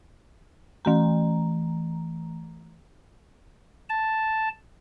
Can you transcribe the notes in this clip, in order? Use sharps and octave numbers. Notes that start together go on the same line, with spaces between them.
E3 A3 A#5
A5